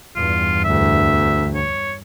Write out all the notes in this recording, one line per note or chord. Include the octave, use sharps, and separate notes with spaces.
E2 G2 F4
D2 E5
C#5